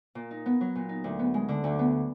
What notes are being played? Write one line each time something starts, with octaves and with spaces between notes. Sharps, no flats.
A#2
D#4
B3
F#3
A#2
D#4
D2
B3
G#3
D3
D2
B3